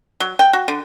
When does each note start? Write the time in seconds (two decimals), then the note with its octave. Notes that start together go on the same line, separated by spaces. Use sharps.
0.20 F#3
0.39 G5
0.53 F#4
0.68 D3